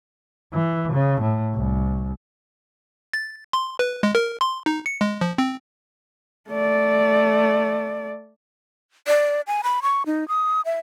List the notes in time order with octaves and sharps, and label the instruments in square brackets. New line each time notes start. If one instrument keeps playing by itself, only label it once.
[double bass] E3
C#3
A2
C2
[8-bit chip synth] A6
C6
B4
G#3
A#4
C6
D#4
C#7
G#3
F3
C4
[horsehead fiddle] A3 D5
[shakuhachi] D5
G#5
B5
C#6
D#4
D#6
E5